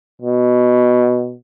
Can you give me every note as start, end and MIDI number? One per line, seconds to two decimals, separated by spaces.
0.22 1.35 47